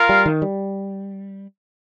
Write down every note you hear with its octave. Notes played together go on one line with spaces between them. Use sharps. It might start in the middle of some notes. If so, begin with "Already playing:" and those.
Already playing: F4 A#4 F5
G3
D#3
G3